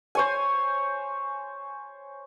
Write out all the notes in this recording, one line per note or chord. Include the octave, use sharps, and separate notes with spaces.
C5 C#5 G#5